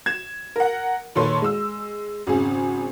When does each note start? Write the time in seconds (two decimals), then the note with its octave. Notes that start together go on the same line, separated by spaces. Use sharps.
0.06 G#6 E7
0.56 A#4 F#5
1.15 A#2 D#3 A4 B4 C#5 C6
1.42 G#3 E6
2.27 G#1 C#3 G#4